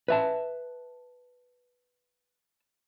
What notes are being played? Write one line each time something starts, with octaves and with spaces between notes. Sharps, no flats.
B4 E5 A5